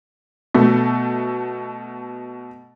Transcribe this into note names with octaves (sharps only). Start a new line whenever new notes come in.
B2 A3